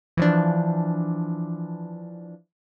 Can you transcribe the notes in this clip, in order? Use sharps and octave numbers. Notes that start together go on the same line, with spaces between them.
E3 F3 D4